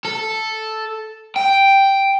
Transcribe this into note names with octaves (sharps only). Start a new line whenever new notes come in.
A4
G5